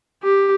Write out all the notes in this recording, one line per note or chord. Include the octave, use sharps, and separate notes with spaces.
G4